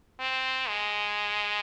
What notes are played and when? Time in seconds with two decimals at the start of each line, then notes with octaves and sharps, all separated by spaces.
0.20 C4
0.68 G#3